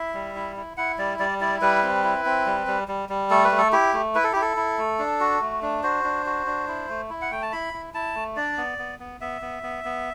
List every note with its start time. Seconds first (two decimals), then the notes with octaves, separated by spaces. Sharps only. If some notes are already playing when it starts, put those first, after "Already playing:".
Already playing: E4 E5
0.14 G3
0.35 E4
0.56 E4
0.77 E4 F#5
0.98 G3 D5
1.19 G3 D5
1.40 E4 D5
1.61 G3 B4
1.83 C4
2.04 E4
2.25 C4
2.46 G3
2.67 G3
2.88 G3
3.09 G3
3.31 A3 A4
3.44 B4
3.51 A3
3.58 A4
3.72 E4 G4
3.93 A3
4.15 E4 B4
4.24 A4
4.33 E4 G4
4.41 A4
4.57 E4
4.78 A3
4.99 D4
5.20 F#4
5.41 A3
5.62 D4
5.83 F#4 C5
6.04 D4
6.26 F#4
6.47 D4
6.68 E4
6.89 A3
7.10 E4
7.22 F#5
7.31 A3 G5
7.42 A5
7.52 E4 B5
7.73 E4
7.94 E4 A5
8.15 A3
8.36 D4 D5
8.57 B3
8.78 B3
8.99 B3
9.21 B3 E5
9.42 B3
9.63 B3
9.84 B3